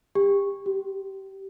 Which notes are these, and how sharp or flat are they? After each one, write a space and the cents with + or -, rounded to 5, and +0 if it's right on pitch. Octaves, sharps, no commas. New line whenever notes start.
G4 +30
G4 -25